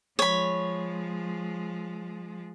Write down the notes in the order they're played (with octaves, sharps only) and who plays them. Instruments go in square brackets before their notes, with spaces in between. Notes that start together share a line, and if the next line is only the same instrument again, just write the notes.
[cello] F3 G#3 [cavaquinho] C#5 B5